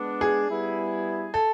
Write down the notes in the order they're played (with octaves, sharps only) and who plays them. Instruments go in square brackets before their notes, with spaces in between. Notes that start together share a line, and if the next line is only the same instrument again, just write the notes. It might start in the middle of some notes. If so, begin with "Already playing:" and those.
Already playing: [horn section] G#3 B3 D4
[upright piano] G#4
[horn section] G3 B3 E4
[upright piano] A4